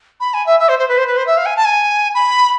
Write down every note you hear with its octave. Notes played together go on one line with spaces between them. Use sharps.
B5
G#5
E5
E5
C5
C5
B4
C5
B4
C5
E5
F5
G#5
A5
G#5
B5